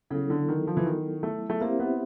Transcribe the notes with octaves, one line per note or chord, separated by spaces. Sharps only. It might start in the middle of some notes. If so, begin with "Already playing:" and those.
C#3 F#3 B3 E4 A4
D3
D#3
F3
E3
D#3
A3
A3
A#3 C4 E4 G4 C5 E5
B3